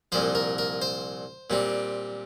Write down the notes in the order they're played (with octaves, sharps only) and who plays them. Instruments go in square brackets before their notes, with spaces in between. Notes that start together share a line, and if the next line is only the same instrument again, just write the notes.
[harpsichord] C2 A#2 F3 C5
A#4
A#4
C5
A#2 G3 C4